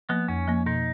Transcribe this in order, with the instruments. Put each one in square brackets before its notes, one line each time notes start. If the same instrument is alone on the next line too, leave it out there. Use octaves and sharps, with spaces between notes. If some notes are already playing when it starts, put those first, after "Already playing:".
[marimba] F3 A#3 [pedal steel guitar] B3
[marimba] F2 [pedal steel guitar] C#4
[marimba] F3 A#3
[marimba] B2 [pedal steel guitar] D#4